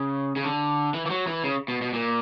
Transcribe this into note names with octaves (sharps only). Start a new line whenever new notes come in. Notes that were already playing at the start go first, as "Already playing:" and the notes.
Already playing: C#3
C#3
D3
E3
E3
F#3
E3
C#3
B2
B2
A#2